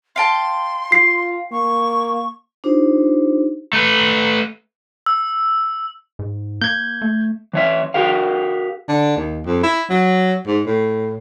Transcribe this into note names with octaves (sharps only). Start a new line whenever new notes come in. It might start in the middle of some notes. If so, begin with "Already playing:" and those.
F5 G5 A5 C6
F4 C7
A#3 C#6
D4 D#4 F4 G4 C5
A3 B4
E6
G#2
A#3 G6 G#6
A3
E3 C#5 E5
F#4 G4 A#4 F5
D3
D#2
F2
E4
F#3
G#2
A2